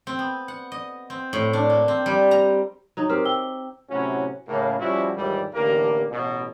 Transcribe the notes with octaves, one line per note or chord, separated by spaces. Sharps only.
C4
B3
F#5
D#5
C4
A2
D4
A#3
C4
G3
A#5
F#3 D#4
C4 G4 A#4 F6
G5 E6 G7
A2 C3 F#3 C#4 E4 F#4
A2 C#3 A#3
F3 G3 C#4 E4 F#4
A#1 D#2 G#2 E3 G3
A1 D3 E3 A#3 G4 A#4
A1 B2